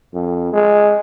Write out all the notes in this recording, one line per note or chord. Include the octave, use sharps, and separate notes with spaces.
F2
G#3